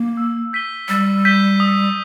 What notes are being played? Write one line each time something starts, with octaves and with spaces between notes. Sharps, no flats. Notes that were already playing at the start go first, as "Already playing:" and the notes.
Already playing: A#3
E6
G6 B6 D#7 G7
G3 E6
G6 B6 D#7 G7
D#6